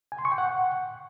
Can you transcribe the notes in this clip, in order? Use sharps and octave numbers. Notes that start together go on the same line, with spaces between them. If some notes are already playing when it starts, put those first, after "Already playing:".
G#5
C6
C#6
G5
F#5